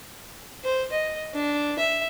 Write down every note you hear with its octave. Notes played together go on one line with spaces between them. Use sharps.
C5
D#5
D4
E5